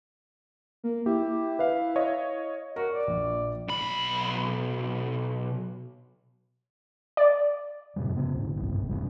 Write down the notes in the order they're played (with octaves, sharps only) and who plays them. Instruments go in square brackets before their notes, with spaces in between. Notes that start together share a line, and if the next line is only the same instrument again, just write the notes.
[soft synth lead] A#3
[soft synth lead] E4 [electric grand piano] G4
[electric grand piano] B4 E5 F5
C#5 D#5 F5
[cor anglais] F#4 [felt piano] A#4
[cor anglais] D5
[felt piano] A#1
[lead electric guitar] B1 B5
[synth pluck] D5
[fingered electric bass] F#2 A2 C3 G3
C#3 B3
D2 G#2
F#1 C2 G2
F#1 G2 B2
D1 F2 B2 G3